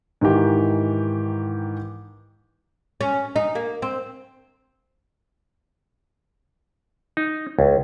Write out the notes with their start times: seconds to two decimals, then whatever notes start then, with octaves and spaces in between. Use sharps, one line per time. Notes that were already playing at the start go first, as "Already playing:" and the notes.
0.21 G#2 D#3 E3 G4
3.01 C#4
3.36 D#4
3.55 A#3
3.82 C4
7.17 D#4
7.59 C#2